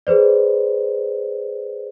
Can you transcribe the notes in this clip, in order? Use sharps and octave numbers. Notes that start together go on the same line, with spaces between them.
G#4 B4 C5 D5